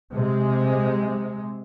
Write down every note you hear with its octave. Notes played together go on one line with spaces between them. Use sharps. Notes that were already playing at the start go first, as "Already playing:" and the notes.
C3 G#3